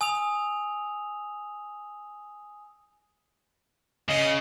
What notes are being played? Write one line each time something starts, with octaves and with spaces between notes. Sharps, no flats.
G#5 D#6 E6 F7
C#3 D#5